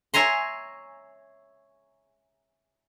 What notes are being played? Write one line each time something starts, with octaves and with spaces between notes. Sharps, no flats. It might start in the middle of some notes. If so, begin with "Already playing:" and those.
C#5 E5 G#5 A#5 C6